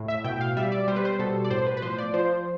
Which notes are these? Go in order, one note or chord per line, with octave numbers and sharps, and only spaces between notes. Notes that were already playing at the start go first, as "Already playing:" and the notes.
Already playing: A2
E5
B2 G5
F5
G3 E5
D5
G3 C5
B4
C5
B2 A4
D5
A2 C5
B4
B4
F3 C5
D5
F3 C5